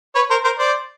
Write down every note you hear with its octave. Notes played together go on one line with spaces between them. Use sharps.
B4 C#5
A#4 C5
A#4 C5
C5 D5